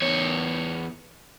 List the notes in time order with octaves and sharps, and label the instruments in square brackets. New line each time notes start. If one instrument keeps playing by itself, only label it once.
[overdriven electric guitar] E2 C#5